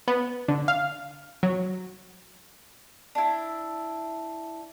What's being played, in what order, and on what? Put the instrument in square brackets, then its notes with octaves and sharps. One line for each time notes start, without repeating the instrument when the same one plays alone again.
[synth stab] B3
D3
F5
F#3
[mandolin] D4 E4